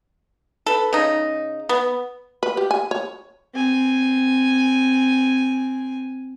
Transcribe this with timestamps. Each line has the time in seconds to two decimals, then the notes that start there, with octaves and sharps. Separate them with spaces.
0.66 A4 B4
0.93 C#3 D#4
1.69 B3
2.43 B4
2.57 G4
2.71 G#5
2.91 C#5
3.54 C4 G#5